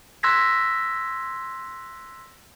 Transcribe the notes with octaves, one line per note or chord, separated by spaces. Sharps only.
C6 E6 F#6 G#6 A#6 B6